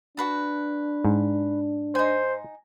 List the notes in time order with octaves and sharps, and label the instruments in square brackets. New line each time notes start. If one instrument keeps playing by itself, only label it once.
[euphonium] D4 [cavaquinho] F#4 B4 A5
[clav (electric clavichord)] G#2
[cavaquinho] D#4 G#5 [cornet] C5